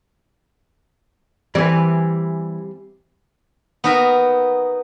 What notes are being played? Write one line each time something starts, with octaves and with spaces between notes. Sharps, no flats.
E3 G3 C4 B4
B3 D#4 F#4 A#4 B4 E5